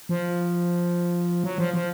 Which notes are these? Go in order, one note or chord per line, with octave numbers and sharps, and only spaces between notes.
F3
F#3
F3
F3